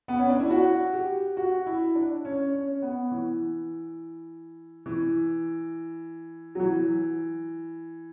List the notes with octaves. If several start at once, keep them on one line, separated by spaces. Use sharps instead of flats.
B3
C#4
D4
E4
F#4
G4
F#4
E4
D4
C#4
C#4
B3
E3
E3
F#3
E3